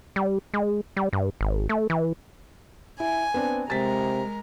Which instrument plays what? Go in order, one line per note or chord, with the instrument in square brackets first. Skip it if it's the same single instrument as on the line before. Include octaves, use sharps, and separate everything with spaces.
[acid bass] G3
G#3
G3
G2
G#1
A3
E3
[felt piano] E4 [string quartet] G#5
[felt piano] B3 C4 D4
[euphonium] C3 [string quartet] G#3 A#4 [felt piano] A6 B6